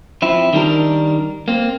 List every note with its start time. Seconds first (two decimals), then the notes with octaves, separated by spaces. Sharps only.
0.22 F3 C4 E4
0.53 D#3 G3 D4 A#4
1.48 A#3 C4